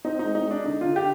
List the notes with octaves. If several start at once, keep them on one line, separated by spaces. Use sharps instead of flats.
C4 D#4
D#4
G#3
D#4
G#3
D4
D3 D#4
F4
D3
G4